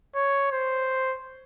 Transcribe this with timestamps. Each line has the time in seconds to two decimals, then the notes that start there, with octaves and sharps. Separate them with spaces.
0.15 C#5
0.52 C5